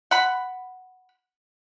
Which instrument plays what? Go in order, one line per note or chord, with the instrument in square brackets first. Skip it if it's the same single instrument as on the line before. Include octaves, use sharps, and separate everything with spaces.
[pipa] F#5 B5